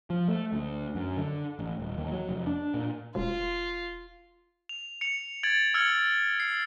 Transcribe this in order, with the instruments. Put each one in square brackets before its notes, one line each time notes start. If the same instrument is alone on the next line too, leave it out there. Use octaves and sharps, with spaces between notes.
[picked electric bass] F3
A3
D2
F#2
D3
A1
D#1
D#2
F#3
F1
D4
A#2
[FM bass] E1 [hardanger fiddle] F4
[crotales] F7
C#7 F7
G#6 A6 D7 F#7
E6 F6 G#6 C#7 F#7
C7